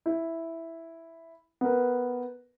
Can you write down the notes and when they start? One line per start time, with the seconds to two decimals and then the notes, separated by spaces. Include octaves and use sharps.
0.06 E4
1.61 B3 A#4